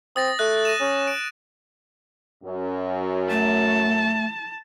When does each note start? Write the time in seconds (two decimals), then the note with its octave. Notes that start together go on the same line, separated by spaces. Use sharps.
0.16 C4 D#6 A6 A#6
0.39 A3 F#6
0.65 A#6 D#7 E7
0.80 C#4
1.07 D7
2.43 F#2
3.30 A3 A5